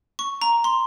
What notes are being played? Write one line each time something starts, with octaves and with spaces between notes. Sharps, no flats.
C#6
A#5
C6